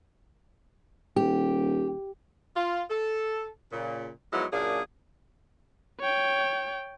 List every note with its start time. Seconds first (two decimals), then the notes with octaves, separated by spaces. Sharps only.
1.16 D#1 G4
2.56 F4
2.90 A4
3.72 A#2 C#3
4.32 F3 F#3 G#3 B3 D#4 E4
4.53 F#2 A#2 A#3 D4 G#4
6.00 C#5 G5